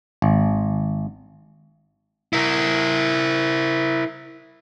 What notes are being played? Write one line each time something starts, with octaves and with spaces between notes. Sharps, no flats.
G#1
E4 A#4